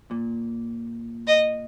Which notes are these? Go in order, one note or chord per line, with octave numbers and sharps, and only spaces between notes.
A#2
D#5